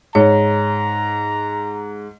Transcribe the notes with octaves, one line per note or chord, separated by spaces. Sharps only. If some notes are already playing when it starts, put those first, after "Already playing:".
G#2 C#5 A#5